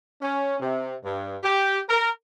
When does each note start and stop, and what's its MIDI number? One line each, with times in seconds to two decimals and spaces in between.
0.22 0.56 61
0.60 0.94 48
1.04 1.36 43
1.43 1.80 67
1.89 2.09 70